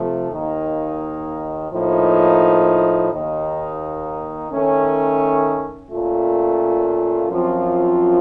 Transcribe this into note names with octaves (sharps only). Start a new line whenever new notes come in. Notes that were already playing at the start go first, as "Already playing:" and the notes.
Already playing: C3 F3 A3
D#2 D#3 A#3 D#4
A2 F3 A#3 D#4
D#2 D#3 A#3 D#4
D#3 A3 C#4
A#2 A3 C#4 F4
F#2 F3 C4 F4